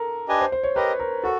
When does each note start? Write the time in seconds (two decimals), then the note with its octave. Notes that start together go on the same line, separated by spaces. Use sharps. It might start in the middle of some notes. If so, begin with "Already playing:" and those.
Already playing: A4 A#4
0.28 D4 G4 B4 D#5 G#5
0.40 C5
0.52 C5
0.63 C#5
0.76 G4 A#4 B4 D#5
0.99 A#4
1.24 F#4 A4